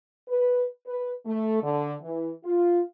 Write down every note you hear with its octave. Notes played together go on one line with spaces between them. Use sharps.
B4
B4
A3
D3
E3
F4